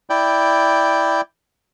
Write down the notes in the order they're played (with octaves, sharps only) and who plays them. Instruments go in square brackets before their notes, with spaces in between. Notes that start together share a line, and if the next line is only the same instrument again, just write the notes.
[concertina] E4 D5 G5